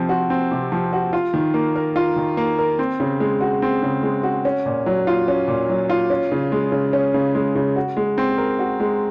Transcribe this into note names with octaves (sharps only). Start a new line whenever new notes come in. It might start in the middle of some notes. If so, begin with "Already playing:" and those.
Already playing: C3 F3 C4
F#4
C4
C3
F3
F#4
F4
D#3
A#3
A#4
F4
D#3
A#3
A#4
C4
C#3
G#3
F#4
C4
C#3
G#3
F#4
C#4
A#2
F#3
F4
C#4
A#2
F#3
F4
C#4
C#3
G#3
C#3
C#4
C#3
G#3
C#3
F#4
G#3
C4
A#4
F#4
G#3